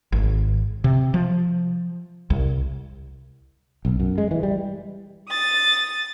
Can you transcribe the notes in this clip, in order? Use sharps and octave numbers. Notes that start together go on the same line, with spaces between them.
G#1
C3
F3
C2
B1
F#2
G#3
E3
G3
D#6 A6